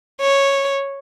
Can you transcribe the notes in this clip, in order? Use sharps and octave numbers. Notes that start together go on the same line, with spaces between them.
C#5